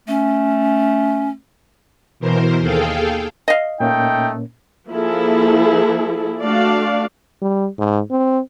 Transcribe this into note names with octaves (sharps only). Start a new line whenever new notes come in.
A3 C#4
B2 E3 A#4 C5
D#2 G#4 A4 F5 G5
D#5 F5
A#2 A3 A#3 C#4 D#4 G5
F3 A#3 E4 G#4 A4
A3 D4 F#4 D5 F5
G3
G#2
C4